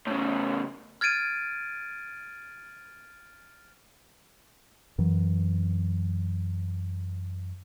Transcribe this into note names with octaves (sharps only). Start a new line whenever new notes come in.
A2 C#3
F6 G#6 A6 D7 D#7
F#2 E3 F#3